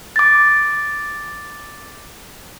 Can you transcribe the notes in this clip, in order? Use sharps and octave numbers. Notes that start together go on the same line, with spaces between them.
D6 A6